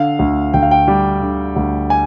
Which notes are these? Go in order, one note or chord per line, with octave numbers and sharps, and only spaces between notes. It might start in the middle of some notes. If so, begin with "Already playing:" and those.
Already playing: D3 F5
D2
D2 G5
F5
G5
G3
D3
D2
G#5